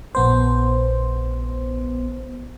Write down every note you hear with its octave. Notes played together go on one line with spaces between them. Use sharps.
A#1 B3 C5